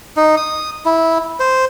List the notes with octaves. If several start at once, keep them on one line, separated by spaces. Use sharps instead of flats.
D#4
D#6
E4
C5